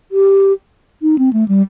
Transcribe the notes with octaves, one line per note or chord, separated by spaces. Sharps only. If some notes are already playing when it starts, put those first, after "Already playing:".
G4
D#4
C4
A3
G3